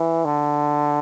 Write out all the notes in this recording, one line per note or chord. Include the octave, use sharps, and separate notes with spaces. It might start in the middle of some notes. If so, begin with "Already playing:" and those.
Already playing: E3
D3